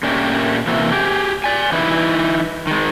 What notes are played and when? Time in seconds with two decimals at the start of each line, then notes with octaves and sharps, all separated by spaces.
0.03 A#2 A3 C#4 D4 G4 A#4
0.67 C3 E3 A#3 F#4 E5
0.92 G4 G#4
1.44 D5 G#5
1.72 E3 D#4 E4 B4
2.67 D#3 G#3